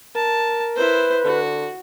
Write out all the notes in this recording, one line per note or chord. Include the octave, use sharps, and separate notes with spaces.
A#4 A5
E4 B4 C5
D3 F#4